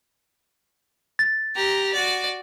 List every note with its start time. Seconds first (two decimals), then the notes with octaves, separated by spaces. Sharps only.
1.19 A6
1.55 G4 A#5
1.93 F#4 D5